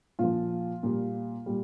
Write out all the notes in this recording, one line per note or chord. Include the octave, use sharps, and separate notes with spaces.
A#2 F3 F4
A#2 G3
A#2 G3